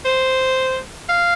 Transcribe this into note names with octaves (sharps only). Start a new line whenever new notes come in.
C5
F5